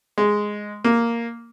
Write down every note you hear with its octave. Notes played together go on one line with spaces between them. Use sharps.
G#3
A#3